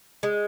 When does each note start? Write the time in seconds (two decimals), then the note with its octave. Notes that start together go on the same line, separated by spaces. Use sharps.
0.23 G#3